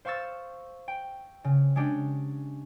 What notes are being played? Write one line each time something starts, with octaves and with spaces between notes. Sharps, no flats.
C5 F5 C#6 E6 A6
G5
C#3
G#3 C#4 D4 G4